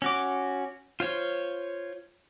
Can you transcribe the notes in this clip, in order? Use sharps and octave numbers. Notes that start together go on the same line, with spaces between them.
C#4 F#4 D6
F4 C5 C#5